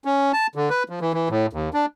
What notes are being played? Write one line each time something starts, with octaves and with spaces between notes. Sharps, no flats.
C#4
A5
D3
B4
F3
E3
E3
A2
D#2
D4